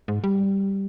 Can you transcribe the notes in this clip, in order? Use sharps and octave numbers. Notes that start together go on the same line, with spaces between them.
G#2
G3